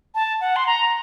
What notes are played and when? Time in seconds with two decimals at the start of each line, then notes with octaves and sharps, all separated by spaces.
0.15 A5
0.41 F#5
0.56 C6
0.67 A#5